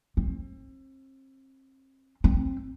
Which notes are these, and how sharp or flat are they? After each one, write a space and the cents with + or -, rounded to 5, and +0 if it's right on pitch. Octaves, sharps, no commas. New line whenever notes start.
C4 +35
C4 +20